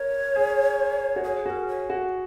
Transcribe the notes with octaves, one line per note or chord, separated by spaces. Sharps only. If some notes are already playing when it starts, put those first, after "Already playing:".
Already playing: A#4 C#5
G#4
F#4
G#4 C#5
F#4 A#4 C#5
C#5
F#4